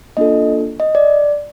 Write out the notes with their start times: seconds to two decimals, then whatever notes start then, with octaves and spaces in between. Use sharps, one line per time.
0.17 A#3 D4 F4 A4 D#5
0.80 D#5
0.95 D5